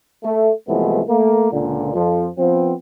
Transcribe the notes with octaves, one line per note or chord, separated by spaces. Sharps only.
A3
C2 E3 F3 G#3 A3 B3
A3 A#3
C#2 A#2 D3
F2 F3
F3 B3 C4